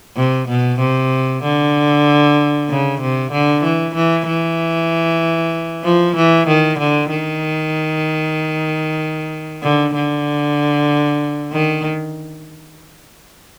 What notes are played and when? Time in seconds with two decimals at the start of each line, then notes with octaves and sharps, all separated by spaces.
0.17 C3
0.48 B2
0.80 C3
1.43 D3
2.69 C#3
3.01 C3
3.32 D3
3.63 E3
3.94 E3
4.26 E3
5.84 F3
6.16 E3
6.48 D#3
6.78 D3
7.10 D#3
9.62 D3
9.94 D3
11.52 D#3